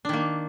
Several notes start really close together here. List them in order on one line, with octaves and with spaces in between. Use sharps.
D4 D#3 A#3